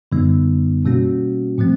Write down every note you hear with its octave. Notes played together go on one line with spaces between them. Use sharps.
F#2 D3 G3 B3 D#4
B2 G3 A#3 C#4 F#4
A2 F3 A3 C4